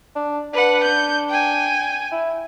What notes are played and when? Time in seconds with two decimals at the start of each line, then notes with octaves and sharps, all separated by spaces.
0.15 D4
0.54 D4 B4 F#5
0.84 G6
1.29 G5 G#5
2.12 E4